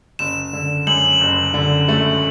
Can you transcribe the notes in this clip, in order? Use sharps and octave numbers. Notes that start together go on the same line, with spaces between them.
F#1 E7
D3
F#2 F#7
F#1
D3
A3